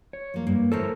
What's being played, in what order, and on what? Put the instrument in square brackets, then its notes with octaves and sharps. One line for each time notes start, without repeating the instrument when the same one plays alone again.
[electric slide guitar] C#5
[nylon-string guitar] F3 A#3
[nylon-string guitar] G2 [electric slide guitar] A#3
[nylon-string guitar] D2 E3 C#5 [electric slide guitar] A4 A#4 C5